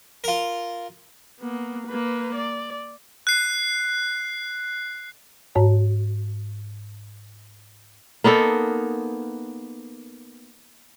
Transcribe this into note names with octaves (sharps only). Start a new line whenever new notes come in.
F4 A#4
A#3 B3
A#3 B4
D5
F#6 C7
G#2 F#4 C#5 A#5
A#3 B3 D#4 A4